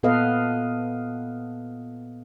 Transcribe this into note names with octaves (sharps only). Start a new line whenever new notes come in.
A#2 B3 A4 B4 D#5 F5